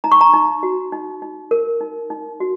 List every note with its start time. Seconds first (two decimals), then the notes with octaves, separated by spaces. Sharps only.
0.04 D#4 A#5
0.12 C#6
0.21 A#5
0.33 D#4
0.63 F#4
0.92 D#4
1.22 D#4
1.51 A#4
1.81 D#4
2.10 D#4
2.40 F#4